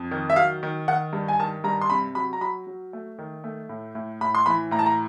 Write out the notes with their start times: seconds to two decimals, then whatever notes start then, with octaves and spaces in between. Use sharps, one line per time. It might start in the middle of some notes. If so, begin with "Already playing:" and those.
Already playing: F2
0.11 D#3
0.30 E5
0.36 F#3 F5
0.63 D#3
0.88 D#3 F#5
1.13 G2
1.28 G#5
1.39 D#3 A5
1.64 G2 A#5
1.81 C6
1.90 C3 B5
2.15 F#3 B5
2.33 A#5
2.41 F#3 B5
2.67 F#3
2.93 A3
3.19 D#3
3.44 A3
3.69 A2
3.95 A2
4.21 A2 B5
4.35 C6
4.46 E3 B5
4.71 A2 A#5
4.79 A5
4.86 A#5